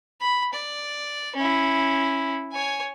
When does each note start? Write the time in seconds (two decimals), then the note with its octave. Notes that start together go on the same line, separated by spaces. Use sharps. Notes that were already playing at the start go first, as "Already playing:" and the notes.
0.21 B5
0.53 D5
1.36 C#4 E4
2.52 C#5 G#5